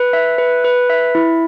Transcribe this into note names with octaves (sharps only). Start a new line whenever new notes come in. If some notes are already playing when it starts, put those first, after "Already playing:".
Already playing: B4
E5
B4
B4
E5
E4